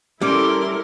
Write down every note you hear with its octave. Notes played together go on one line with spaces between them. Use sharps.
G3 C#4 E4 A4 A#4 C6 D6